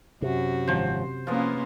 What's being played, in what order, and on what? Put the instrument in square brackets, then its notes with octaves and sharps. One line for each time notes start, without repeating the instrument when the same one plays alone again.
[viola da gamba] F#2 F#4 [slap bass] C3
[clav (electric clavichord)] G#1 F3 F#3 [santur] C5
[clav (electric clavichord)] F3 [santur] G#3 B3 F4 [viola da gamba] A#3 C#4 E4